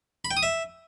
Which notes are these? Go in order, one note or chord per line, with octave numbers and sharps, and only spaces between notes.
B5
G5
D#6
E5